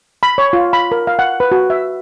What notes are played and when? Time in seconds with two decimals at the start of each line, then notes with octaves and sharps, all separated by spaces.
0.23 B5
0.38 C#5
0.53 F4
0.73 B5
0.92 A#4
1.07 F5
1.19 F#5
1.40 B4
1.52 F#4
1.70 E5